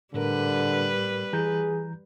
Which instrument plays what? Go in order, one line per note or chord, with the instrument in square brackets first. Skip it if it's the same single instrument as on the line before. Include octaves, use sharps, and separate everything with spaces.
[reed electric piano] A2 A#4 [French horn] D3 [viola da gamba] G3 B4
[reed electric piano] E3 A#5 G6 [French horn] G#4